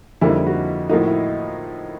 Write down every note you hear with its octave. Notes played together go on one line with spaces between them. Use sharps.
F2 D3 G3 A#3 E4
D#4
E4
F#4
A2 F3 A#3 D#4 F#4
E4